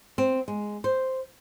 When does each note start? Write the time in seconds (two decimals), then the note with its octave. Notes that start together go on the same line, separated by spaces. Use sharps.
0.18 C4
0.48 G#3
0.84 C5